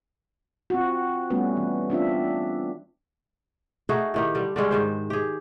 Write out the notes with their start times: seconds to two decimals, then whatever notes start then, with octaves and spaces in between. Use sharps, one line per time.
0.70 C4 F4 F#4
1.30 G3 A3 B3 C#4 F#4 B4
1.57 E3
1.90 C4 D4 F4 E5
3.89 A3 D#4 F#4 G#4
4.14 A2 D#3 G4
4.35 D3 G3
4.56 D3 G3 G#3 C#4
4.71 G#2 D#3 C5
5.10 G4 G#4